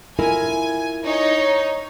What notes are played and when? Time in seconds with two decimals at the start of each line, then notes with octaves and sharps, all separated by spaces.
0.19 E4 F4 A#4 G#5
1.05 D#4 C#5